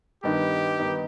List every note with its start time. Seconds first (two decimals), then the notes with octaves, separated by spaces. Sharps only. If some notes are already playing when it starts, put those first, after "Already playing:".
0.23 G2 D#3 B3 D#4 G4
0.79 G2 D#3 B3 D#4